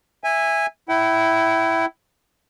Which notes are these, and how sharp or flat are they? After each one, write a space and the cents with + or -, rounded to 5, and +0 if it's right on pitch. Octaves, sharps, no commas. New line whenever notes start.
E5 +0 G#5 -15
E4 +0 G5 -40